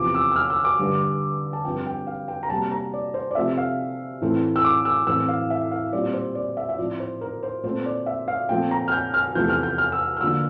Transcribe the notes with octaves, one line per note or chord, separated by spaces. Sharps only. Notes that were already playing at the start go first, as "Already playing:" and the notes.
Already playing: E2 C3 F3 D6
E6
E6
F6
E6
D6
G2 D3 G3
A5
G2 F3 C4 G5
G5
F5
G5
A#5
C3 G3 A#3 A5
A#5
D5
C5
D5
C3 F3 A3 C4 E5
F5
A2 E3 A3 C4
E6
D6
E6
A2 E3 A3 C4 E6
F5
E5
F5
A#2 G3 C4 D5
C5
D5
E5
E5
A2 F3 C4 D5
C5
A#4
C5
A#2 A3 C4 C5
D5
E5
F5
A#2 F3 A3 C4 G5
A#5
F6
G6
F6
E2 C3 F3 A3 G6
F6
G6
F6
E6
F6
D3 F3 A#3 E6